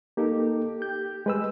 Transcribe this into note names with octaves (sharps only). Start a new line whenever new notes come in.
A#3 D#4 G4 A4
G6
G#3 B4 E6